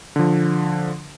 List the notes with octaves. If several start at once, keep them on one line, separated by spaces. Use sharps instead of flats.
D3 F3